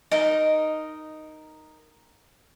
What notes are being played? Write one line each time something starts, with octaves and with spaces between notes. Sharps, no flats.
D#4 A#4 D#5